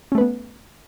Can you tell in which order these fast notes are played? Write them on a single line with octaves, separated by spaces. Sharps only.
C#4 A3 B4 B3